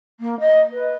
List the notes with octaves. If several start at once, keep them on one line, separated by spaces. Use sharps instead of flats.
A#3
D#5
B4